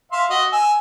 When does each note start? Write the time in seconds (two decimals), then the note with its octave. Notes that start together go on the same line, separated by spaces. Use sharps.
0.12 E5 F5 C6
0.30 F#4 D#5
0.53 G#5 E6